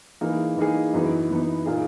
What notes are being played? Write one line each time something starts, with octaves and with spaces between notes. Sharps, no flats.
E3 A#3 D#4 G#4
E3 A#3 D#4 G#4
F#2 E3 B3 D#4
F#2 E3 B3 D#4
A#2 A#3 D#4 G#4